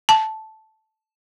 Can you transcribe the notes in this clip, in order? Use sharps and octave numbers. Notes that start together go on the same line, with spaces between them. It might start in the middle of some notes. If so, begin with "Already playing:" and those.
A5